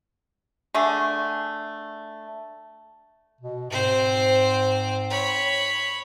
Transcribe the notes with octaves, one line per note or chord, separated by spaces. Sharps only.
D3 A3 G#4
B2
G#2 C4 C5
C#5 B5